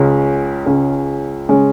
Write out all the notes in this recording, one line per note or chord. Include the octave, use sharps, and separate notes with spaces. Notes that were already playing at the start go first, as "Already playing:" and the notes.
Already playing: C#2 C#3 G#3 C#4
C#2 C#3 G#3 C#4
C#3 G#3 C#4